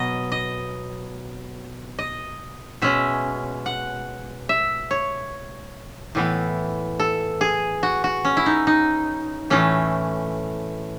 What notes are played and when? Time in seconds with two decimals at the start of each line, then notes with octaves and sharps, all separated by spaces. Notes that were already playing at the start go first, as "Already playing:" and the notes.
Already playing: B2 F#3 B3 D#5
0.32 D#5
1.99 D#5
2.82 B2 G#3 C#4 E5
3.66 F#5
4.49 E5
4.91 C#5
6.15 A2 E3 B3
7.00 A4
7.41 G#4
7.83 F#4
8.04 F#4
8.25 C#4
8.37 E4
8.46 D#4
8.67 D#4
9.50 A2 E3 A3 C#4